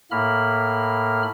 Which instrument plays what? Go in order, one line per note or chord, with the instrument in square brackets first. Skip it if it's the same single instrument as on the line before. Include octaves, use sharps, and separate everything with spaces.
[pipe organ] A2 A#3 B5 F6